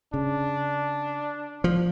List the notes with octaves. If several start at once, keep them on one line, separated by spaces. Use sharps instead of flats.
C#3 D4
F3